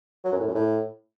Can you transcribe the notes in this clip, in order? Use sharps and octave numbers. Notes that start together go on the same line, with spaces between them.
F#3
F#2
A2
F#2
A2